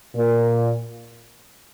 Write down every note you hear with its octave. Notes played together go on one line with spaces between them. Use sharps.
A#2